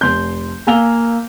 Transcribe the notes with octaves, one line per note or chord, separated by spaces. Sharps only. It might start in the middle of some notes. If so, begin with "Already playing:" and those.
F1 C6 G6
A#3 F5 G#5 E6 F7 G7